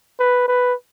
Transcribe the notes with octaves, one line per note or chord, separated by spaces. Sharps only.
B4
B4